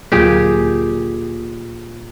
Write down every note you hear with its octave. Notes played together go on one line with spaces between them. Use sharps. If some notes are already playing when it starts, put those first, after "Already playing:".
D2 A#2 F#3 A#3 G4 G#4